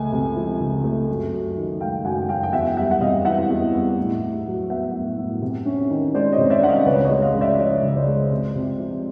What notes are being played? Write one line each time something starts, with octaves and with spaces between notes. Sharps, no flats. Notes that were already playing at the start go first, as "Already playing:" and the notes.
Already playing: C#2 A3 G#5
C3
F3
C#2
A3
F#2
F#2
D#3
G#3 F5 G5
F#2 F#5 G#5
F#2 F5 G5
G5
E2 E5 F#5
G3 E5 F#5
F#5
C3 D#5 F5
E3 E5 F#5
E2
G3
A2
A2
F#3
B3 E5 F#5
A2
A2
C3
C#4
D#3
G#3 C5 D5
C#5 D#5
C3
D5 E5
C#4 F#5
D#5 F5
C#2 B4 C#5
C#5 D#5
G#3
D#5 F5
C#3
D5 E5
F3 C#5 D#5
C#2
C5 D5
G#3
C3
C3
F3